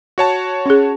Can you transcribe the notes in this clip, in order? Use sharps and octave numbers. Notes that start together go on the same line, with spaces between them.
F#4 C#5 A5
C#4 G#4